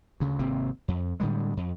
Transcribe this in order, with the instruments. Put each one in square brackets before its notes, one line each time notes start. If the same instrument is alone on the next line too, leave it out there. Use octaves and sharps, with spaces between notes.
[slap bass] D2 C#3
G#1 C3 A#3 C4
F2
A2 D3 G3 G#3
F2